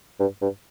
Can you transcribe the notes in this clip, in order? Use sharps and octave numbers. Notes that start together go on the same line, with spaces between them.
G2
G2